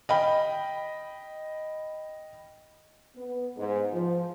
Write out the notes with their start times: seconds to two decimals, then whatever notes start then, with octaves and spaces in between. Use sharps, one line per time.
0.09 D#5 G5 B5
3.16 B3
3.57 G#2
3.92 F3